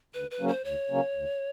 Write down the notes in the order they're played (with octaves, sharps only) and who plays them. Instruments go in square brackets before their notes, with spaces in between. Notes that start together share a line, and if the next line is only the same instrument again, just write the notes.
[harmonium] D2 [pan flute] B4
[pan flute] B4
[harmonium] C#3 F#3 A#3 C#4
[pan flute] C5
[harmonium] D2 [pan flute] C#5
[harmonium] C#3 F#3 A#3 C#4
D2